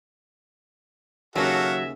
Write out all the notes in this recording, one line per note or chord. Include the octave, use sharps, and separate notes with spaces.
D#2 C#3 F#3 F#4 A4 E5 F5